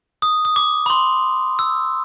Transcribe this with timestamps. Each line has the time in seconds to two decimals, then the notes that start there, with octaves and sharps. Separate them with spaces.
0.22 D#6
0.45 D#6
0.56 D6
0.86 B5
0.90 C6
1.59 E6